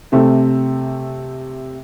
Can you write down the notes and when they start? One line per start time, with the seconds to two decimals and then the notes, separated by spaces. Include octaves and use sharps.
0.12 C3 A3 C4